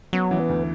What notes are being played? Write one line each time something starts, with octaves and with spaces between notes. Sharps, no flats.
F#3 B3
E3
B3
D2